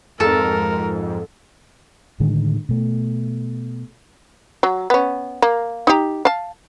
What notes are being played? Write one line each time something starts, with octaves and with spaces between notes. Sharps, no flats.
F2 G#2 A4 A#4
A2 D3 D#3 G#3
B2 A3
F#3
B3 C#4
A#3
D#4 G4
F5 A5